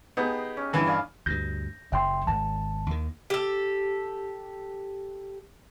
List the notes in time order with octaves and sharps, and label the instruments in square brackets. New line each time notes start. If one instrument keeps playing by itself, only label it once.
[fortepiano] B3 [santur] D#4 G4 G#4
[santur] C#4
[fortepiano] G2 E3 [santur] G#5 B5
[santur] D5 F5 G#5
[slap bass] D2 G2 [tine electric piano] G6 A#6
[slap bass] F#1 [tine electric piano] E5 G5 C6
[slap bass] G#1 [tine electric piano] A5
[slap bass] D#2 D#3
[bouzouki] G4 A4